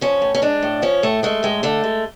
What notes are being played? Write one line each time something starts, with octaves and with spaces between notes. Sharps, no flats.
F3 C#4
A2
C#4
G#3 D4
A2
F3 C#4
A2 A3
G#3 A3
A2 G#3
D3 A3
G#3